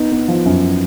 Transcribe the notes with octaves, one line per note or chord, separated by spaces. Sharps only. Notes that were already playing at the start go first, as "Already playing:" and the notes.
Already playing: B3 D#4
B3
F3
F#2